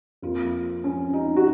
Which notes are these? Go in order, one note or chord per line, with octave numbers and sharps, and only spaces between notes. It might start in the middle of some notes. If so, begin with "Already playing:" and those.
F2 F3 A#3 F4
C#4
D#4
F#4